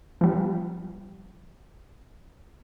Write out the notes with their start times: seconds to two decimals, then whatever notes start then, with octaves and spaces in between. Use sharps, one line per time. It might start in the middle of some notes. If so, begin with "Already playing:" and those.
0.21 F3 G3